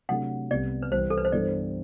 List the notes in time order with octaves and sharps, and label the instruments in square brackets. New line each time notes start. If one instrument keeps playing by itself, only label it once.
[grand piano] C3 F#3 A3 D4 A4 [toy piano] F#5
[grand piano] C2 C3 G3 B3 [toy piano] D5
[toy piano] B4
[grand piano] C2 C3 E3 [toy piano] C5
[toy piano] A4
B4
C5
[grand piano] G2 E3 B3 E4 A4 [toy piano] D5